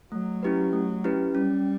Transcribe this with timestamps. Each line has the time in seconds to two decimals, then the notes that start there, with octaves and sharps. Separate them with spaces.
0.12 F#3 A3
0.43 C#4 E4 G4 B4
0.73 A3
1.04 C#4 E4 G4 B4
1.34 G3 C#4